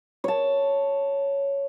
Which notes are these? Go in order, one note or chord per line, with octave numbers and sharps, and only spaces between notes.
C#5 A5